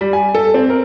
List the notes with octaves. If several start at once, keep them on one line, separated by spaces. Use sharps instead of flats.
G3
G#5
A4
C4
A#4